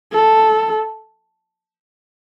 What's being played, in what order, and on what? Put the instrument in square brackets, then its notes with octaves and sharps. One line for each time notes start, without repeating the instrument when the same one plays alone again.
[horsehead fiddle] A4